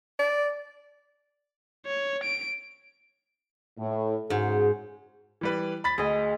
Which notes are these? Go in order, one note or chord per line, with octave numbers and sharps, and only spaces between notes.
D5
C#5
D7
A2
G#2 C#3 F#4 G#4
E3 G3 B4
B5 A6 B6
D2 G#4 D#5